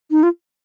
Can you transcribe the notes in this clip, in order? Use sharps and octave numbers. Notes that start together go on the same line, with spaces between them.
D#4
F4